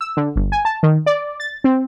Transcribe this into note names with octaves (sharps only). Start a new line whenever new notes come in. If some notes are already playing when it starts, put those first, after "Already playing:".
E6
D3
G1
G#5
A5
D#3
D5
A6
C4